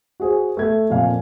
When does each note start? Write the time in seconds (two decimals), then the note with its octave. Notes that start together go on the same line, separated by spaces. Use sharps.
0.20 F#4 G#4 C5
0.57 A3 E5 G#6
0.90 F2 A#2 F5 G#5